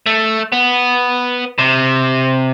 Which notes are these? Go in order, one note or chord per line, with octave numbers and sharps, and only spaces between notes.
A3
B3
C3